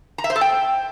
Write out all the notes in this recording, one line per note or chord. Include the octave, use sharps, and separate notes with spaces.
A#5
E5
C5
A4
G5